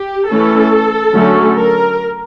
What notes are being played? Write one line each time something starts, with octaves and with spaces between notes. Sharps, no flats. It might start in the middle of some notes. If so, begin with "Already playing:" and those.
Already playing: G4
E3 A3 C#4 A4
D3 F#3 A3 C#4
A#4